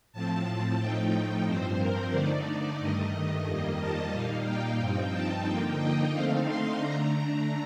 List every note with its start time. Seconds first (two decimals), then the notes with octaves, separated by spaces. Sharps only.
0.13 A2 F3 C4 A5
0.79 A2 F3 A3 D#4 G5
1.46 G2 F3 C4 C5
1.79 A#4
2.12 D3 A3 D#4 D5
2.80 G2 D#3 A3 D#5
3.45 F2 D#3 G3 A#3
3.80 A5
4.12 A#2 G3 A#3 D#4 F5
4.45 G5
4.79 G2 F3 C4 D#4 G5
5.12 A5
5.46 D3 F3 A#3 D#4 G5
5.78 D#5
6.13 D3 A3 C4 D#4 F5
6.45 C6
6.79 D3 A3 D4 A#5